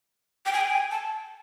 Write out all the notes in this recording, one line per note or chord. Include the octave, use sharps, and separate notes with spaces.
G5
G#5
G5
G#5
A5